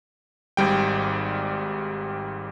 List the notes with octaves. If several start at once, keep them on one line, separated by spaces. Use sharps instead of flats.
G#1 G#2 G3 G5